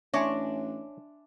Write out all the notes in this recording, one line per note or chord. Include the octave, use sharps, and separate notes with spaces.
A1 D4 C#5 E5 G#5 C6